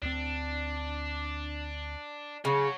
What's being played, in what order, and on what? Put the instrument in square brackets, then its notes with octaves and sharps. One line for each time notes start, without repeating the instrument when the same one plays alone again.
[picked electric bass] D2 C4 [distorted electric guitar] D4
[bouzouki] C#3 [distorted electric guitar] F#4 C#5